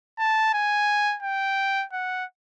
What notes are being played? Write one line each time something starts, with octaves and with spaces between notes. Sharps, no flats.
A5
G#5
G5
F#5